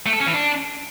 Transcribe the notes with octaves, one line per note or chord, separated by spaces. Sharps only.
A3
A4
C#4
E3
D4